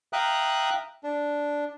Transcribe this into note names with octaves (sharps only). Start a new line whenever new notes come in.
E5 F5 G5 A#5 D#6 F#6
D4